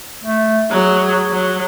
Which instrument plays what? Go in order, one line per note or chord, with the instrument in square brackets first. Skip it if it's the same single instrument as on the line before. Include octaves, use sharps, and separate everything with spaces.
[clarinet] A3
[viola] F#3 [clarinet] G#4
[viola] F#3